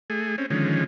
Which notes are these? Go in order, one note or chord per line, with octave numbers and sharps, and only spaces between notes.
A3 G#4
C4 C#4
D3 D#3 F3 G#3 C#4